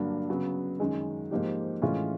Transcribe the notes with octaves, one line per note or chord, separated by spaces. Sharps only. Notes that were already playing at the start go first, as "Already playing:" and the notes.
Already playing: G2 D3 F#3 A#3 D4
C#3 F#3 B3
F#2 D#3 G#3
G#2 F3 A#3 D#4 G4
A2 E3 G#3 C#4 F4